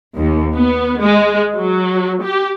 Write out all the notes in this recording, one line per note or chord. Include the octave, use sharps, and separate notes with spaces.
D#2
B3
G#3
F#3
G4